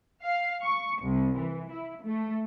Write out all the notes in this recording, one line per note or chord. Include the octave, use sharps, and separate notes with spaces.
F5
C#6
C2
E3
E4
A3